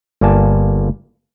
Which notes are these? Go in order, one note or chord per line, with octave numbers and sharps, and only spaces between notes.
G1 A#3 D5 G#5 A5